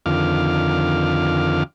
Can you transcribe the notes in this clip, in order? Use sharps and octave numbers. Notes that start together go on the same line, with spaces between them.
F2 D3 D#3 F4 D6 F6